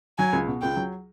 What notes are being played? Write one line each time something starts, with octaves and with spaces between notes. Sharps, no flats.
F#3 G#5
C#2
B2
C#2 G5
F#3